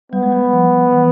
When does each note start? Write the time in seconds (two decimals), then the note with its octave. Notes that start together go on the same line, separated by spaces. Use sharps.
0.12 G3 B3
0.23 G#3
0.32 G3
0.53 F3
0.93 E3